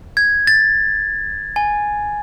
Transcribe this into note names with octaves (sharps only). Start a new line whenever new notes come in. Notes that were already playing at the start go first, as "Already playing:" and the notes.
G#6
A6
G#5